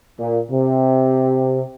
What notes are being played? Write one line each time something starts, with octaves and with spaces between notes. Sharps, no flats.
A#2
C3